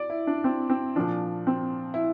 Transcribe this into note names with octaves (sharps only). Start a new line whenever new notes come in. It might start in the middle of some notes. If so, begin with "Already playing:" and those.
Already playing: D5
E4
D4
C4
C4
A#2 F3 D4
C4
E4